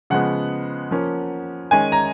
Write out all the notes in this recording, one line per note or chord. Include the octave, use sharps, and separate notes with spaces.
C#3 F3 G#3 B3 F#5
F3 A#3 C#4
D#3 G#3 C#4 G#5
A#5